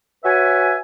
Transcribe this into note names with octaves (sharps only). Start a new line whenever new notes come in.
F#4 B4 C#5 E5 G#5